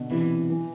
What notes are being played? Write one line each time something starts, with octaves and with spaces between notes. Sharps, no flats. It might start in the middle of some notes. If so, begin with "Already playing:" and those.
Already playing: B2 D3
C3 E3
E3